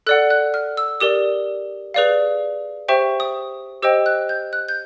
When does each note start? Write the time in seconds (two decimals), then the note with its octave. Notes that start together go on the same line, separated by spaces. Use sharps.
0.07 A4 D5 F#5 F#6
0.30 F#6
0.54 F6
0.77 E6
1.00 G4 A#4 D5 D#6
1.94 G#4 B4 D5 F5
2.88 G4 C5 E5 G5 C#6
3.20 D#6
3.82 G4 C5 D#5 G5 E6
4.06 F#6
4.29 G6
4.53 F#6
4.69 G6